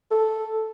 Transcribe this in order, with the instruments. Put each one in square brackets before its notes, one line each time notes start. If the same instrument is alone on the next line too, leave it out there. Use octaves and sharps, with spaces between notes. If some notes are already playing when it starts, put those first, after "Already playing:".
[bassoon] A4